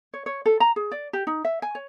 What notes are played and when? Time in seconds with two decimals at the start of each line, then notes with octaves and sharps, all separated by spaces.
0.14 C#5
0.26 C#5
0.46 A4
0.60 A#5
0.76 G#4
0.92 D5
1.13 G4
1.27 D#4
1.45 E5
1.62 G#5
1.75 C#5